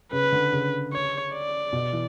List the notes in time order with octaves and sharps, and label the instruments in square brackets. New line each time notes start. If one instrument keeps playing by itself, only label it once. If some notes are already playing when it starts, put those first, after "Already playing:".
[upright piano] C#3 [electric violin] B4
[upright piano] D3
C#3
[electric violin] C#5
D5
[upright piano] B2
E3